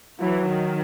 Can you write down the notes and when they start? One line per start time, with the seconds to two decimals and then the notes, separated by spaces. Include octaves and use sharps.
0.19 E3 F#3
0.48 D#3